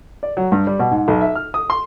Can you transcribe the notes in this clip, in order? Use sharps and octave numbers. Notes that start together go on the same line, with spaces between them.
D5
F#3
G2
G3
B2
G#2
B1
E5
F6
D#6
C6